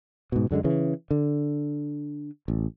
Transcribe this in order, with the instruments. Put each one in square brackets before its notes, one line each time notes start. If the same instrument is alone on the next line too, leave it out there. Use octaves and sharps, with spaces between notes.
[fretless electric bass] G#2 B2
F#2 D3 F#3 G#3
C#3 E3
D3
A1